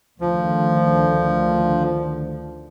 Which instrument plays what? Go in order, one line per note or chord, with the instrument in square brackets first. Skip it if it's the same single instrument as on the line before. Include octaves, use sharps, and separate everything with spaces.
[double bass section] D2 D3 D#3 [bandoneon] F3